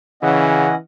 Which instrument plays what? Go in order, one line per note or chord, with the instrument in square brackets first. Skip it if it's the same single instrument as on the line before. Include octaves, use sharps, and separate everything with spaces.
[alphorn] C#3 [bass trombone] E3 [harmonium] C#4 D#5 F#5